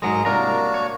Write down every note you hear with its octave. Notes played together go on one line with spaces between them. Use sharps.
G#2 F#3 G#3 A#4 D#5 A#5
C2 A#3 D4 F#4 A#4 A#5
C#5